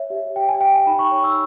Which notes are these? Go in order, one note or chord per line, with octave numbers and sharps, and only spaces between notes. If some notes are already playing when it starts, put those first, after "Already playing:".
Already playing: C#5 E5
G4
G4 G5
G#5
G4 G5
G#5
D#4 B5
C#6
C#5
E6